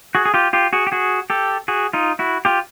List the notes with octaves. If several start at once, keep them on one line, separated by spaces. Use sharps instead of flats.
F#4 G#4
G#4
F4 G4
F4 G4
F#4 G#4
G4
F#4 G#4
G4 A4
F#4 G#4
D#4 F4
E4 F#4
F4 G4